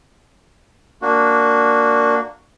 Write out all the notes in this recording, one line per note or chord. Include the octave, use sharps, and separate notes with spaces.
A#3 D4 F#4